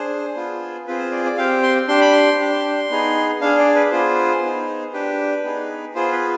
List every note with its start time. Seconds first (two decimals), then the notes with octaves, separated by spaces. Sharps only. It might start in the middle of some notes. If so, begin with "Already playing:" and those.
Already playing: D4 G#4 C5
0.36 B3 F4 G#4
0.87 C4 F4 G#4 B4
0.99 C5
1.12 D5
1.25 D5
1.37 C4 G4 F5
1.63 C6
1.88 D4 G4 C6
2.01 B5
2.12 C6
2.39 D4 G4
2.90 B3 D#4 G#4
3.41 D4 G#4 F5
3.58 D5
3.75 B4
3.91 B3 F4 G#4 C5
4.43 B3 D#4 G#4
4.93 D4 G4 B4
5.44 B3 D#4 G#4
5.94 B3 F4 G#4 C5
6.12 B4